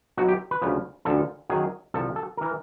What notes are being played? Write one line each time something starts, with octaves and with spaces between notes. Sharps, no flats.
B1 B2 F#3 F#4
G4
B4
D2 C#3 F3
D2 D3 F3 A4
F#2 D#3 F#3 G#4
C2 C3 F3 A4
A4
E3 A#4